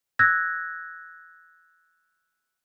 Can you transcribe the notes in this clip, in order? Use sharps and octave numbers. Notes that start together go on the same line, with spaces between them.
E6 F#6 G#6 A#6